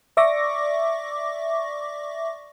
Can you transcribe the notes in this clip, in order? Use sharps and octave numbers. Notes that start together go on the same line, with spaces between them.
D5 E5 C#6 D6 A#6